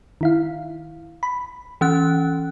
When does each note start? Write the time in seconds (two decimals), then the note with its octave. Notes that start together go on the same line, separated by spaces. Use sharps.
0.21 D#3 E4 F5
1.23 B5
1.81 E3 C#4 F#6